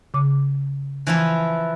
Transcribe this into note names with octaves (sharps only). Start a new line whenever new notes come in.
C#3 D6
E3 F3 E4